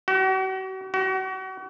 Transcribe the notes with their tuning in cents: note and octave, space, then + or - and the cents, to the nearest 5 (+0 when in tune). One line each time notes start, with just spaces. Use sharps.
F#4 +40
F#4 +35